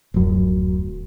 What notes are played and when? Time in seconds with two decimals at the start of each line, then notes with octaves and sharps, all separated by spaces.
0.14 D1 F#2